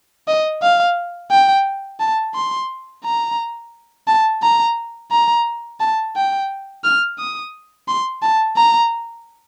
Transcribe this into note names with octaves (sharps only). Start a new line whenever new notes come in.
D#5
F5
G5
A5
C6
A#5
A5
A#5
A#5
A5
G5
F6
D#6
C6
A5
A#5